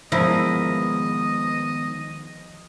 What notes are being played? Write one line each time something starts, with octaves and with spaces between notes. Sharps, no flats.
D#3 F3 G#3 B3 E4 A#4 D#5